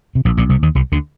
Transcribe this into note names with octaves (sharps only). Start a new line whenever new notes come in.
C3
A#1 A#2
A#1 A#2
C2 C3
D#2 D#3
C2 C3
D2 D3